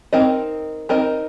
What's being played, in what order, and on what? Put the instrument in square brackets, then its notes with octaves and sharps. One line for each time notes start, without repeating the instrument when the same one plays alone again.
[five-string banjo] C4 D#4 A#4 D#5
C4 D#4 A#4 D#5